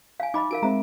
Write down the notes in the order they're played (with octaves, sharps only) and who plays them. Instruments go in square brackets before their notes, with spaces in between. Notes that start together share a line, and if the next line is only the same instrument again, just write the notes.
[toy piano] F5 G#5
[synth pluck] D#4 [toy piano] D#5 B5 D6
[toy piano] F4 A#4 F5 [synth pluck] D7
[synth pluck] G#3 C4 [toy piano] E5 A#5